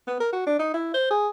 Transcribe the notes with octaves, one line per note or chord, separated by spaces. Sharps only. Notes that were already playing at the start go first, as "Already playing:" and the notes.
B3
A#4
F#4
D4
D#4
E4
C5
G#4